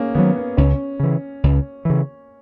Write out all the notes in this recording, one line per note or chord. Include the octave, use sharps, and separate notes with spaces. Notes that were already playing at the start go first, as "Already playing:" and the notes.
Already playing: A#3 C#4 G#4
D#3 F#3 B3
B3
C#2 C#4
C#3 E3
C#2
C#3 E3